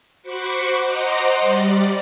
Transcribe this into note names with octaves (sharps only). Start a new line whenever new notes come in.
F#4 C5 F#5 B5 C#6 D6
C5 D#5 F#5 A#5 C6 D6
G3 D5